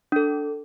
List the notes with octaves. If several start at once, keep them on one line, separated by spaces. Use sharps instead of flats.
D4 A4